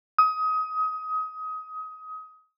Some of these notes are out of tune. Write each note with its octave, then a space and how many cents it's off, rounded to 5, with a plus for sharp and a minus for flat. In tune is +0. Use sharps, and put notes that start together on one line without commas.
D#6 +25